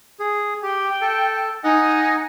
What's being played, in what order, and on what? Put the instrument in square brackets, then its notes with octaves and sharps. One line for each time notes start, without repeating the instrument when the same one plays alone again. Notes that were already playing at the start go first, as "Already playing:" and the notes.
[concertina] G#4
[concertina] G4 [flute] G5
[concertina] A4
[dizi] D#4 [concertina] D#5 F#5 [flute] G#5